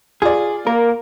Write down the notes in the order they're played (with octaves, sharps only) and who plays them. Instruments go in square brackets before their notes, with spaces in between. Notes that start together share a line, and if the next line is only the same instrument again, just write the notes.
[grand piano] F4 D5 [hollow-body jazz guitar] G#4
[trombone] A#3 [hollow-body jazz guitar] A#4